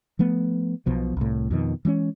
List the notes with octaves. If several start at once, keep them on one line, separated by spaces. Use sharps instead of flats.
F3 A3 B3
B1 B2 F3
C2 A2
F2 B2 D#3
E3 G#3 C4 C#4